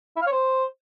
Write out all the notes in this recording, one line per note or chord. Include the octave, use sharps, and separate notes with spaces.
E4
F5
C#5
C5